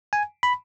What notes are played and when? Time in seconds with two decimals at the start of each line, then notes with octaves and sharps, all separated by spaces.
0.13 G#5
0.43 B5